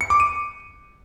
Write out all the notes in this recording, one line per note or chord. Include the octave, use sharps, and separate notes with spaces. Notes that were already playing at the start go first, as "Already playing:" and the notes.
C#7
D6
D#7